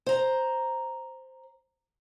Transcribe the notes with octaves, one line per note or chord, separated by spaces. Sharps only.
C5 A#5